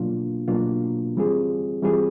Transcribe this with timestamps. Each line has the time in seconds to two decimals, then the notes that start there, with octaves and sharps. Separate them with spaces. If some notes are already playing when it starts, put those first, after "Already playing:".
Already playing: B2 F#3 A#3 D4 F4
0.48 B2 F#3 A#3 D4 F4
1.16 E3 G3 C4 F4 G#4
1.83 E3 G3 C4 F4 G#4